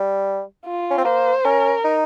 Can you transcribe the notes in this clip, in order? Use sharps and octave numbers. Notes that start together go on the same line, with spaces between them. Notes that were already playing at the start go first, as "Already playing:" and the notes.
Already playing: G3
F4
C#4
C4
A#3 C5
C#4 A#4
D#4